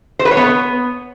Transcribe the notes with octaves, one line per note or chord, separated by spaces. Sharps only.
C5
B4
C#5
B3